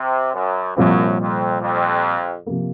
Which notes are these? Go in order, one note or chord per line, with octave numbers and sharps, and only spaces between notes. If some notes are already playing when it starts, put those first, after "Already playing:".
Already playing: C3
F#2
C2 F#2 A#2 F3 C4 F4
F2
F2
C3 F3 A#3